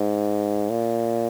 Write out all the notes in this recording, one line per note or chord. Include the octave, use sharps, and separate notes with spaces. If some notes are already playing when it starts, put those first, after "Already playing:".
Already playing: G#2
A#2